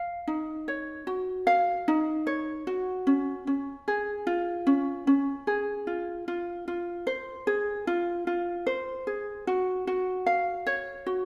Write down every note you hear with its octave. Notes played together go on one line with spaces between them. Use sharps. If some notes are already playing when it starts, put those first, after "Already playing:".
Already playing: F5
D#4
C#5
F#4
F5
D#4
C#5
F#4
C#4
C#4
G#4
F4
C#4
C#4
G#4
F4
F4
F4
C5
G#4
F4
F4
C5
G#4
F#4
F#4
F5
C#5
F#4